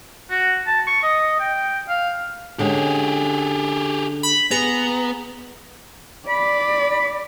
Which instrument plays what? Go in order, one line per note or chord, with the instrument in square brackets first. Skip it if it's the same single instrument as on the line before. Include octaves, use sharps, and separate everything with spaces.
[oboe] F#4
A5
C#6
D#5
G5
F5
[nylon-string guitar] D3 G#3 C#4 [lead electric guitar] G4 G#4
[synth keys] B5
[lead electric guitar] B3 [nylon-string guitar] G#4 [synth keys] A#5
[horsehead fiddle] D5 [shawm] B5